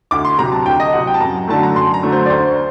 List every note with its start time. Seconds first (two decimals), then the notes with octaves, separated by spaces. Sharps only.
0.11 D2 D6
0.25 C6
0.39 C3 F#3 A#5
0.52 A5
0.66 D2 G5
0.80 D#5
0.93 C3 F#3 F#5
1.07 G5
1.14 A5
1.20 F#2 A#5
1.47 D3 F#3 A3 A5
1.63 A#5
1.75 F#2 C6
1.94 A#5
2.03 D3 F#3 A3
2.12 C5
2.26 D5
2.30 D2 C5